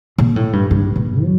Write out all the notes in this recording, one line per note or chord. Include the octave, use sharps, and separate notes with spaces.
A#2
A2
G2
G2
A#2
F#3